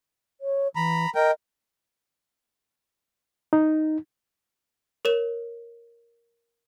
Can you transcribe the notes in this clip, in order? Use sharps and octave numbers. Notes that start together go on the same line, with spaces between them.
C#5
E3 A#5 B5
A#4 D#5 G5
D#4
A#4 C#5 E7